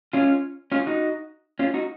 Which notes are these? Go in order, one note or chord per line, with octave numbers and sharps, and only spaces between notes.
C#4 F4
C#4 F4
D#4 F#4
C#4 F4
D#4 F#4